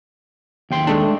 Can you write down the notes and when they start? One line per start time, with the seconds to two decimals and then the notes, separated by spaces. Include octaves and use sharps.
0.71 D#2 G5 C6
0.87 G#3 A3 D4